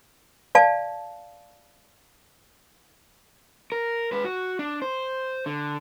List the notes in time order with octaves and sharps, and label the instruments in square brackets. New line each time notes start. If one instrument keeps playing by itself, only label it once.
[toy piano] D5 F5 A5
[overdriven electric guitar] A#4
G#3 B4
F#4
D4
C5
D3